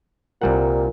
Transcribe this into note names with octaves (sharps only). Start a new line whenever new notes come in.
C2 A#2 G3 F#5